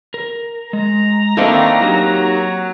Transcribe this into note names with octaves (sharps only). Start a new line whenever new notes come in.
A#4
G#3 A#5
D#3 A3 A#3 C4 D4 E4 D#5 A5
F#3 D#4 G4 A#4